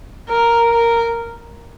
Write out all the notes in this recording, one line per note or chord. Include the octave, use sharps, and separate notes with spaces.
A#4
A#4